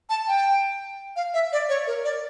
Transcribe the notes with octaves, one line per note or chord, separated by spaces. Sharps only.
A5
G5
F5
E5
D5
C#5
A#4
D5